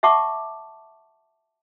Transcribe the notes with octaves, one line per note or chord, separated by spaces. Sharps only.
E5 F#5 A5 C#6 D6